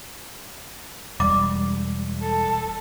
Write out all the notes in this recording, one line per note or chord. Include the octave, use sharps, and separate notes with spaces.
E1 G3 D6
A4